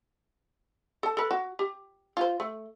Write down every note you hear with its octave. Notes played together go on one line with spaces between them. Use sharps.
A4 A5
A4 B4
F#4
G4
F4 C5
A3